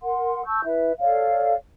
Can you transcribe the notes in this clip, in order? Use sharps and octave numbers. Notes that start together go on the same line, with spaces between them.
A#4 F#5 C6
A5 C#6 E6 G6
E4 B4 E5
A4 C#5 D5 F5